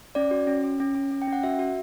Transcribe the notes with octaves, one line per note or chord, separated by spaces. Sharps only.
C#4 D5
F#4
C#4
C#4
C#4
C#4
C#4
G5
C#4
F#5
F#4 E5
F#4